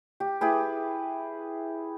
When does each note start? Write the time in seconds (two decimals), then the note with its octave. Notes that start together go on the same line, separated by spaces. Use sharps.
0.20 G4
0.41 E4 G4 G#4 B4